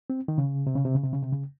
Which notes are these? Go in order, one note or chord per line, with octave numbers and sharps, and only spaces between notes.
C4
D#3
C#3
C3
C#3
C3
C#3
C3
C#3
C3
C#3